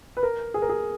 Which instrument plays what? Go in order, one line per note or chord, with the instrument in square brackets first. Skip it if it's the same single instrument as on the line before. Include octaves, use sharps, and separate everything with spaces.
[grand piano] B4
A#4
G#4
A#4
G#4